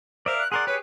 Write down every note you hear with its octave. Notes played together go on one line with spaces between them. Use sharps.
A#4 C5 D5 E5 F5
F#6
G#4 A#4 D5 F#5 C6
G4 G#4 B4 C#5